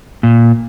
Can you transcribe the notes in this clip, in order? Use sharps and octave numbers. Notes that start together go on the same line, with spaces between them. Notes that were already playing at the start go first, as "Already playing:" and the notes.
A#2